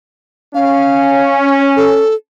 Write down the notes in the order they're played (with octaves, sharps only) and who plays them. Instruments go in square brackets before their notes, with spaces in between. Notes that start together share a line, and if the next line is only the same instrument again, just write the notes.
[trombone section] C#4 [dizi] F5
[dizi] A4